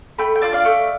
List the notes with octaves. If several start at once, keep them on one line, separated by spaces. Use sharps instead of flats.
A3 G5 B5
G5
D4 F4 F5 A5
D5 F5
A3